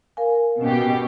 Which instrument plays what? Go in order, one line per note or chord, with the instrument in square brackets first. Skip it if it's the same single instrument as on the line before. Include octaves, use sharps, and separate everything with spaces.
[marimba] A#4 F5 G#5
[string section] B2 G4 [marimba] C#4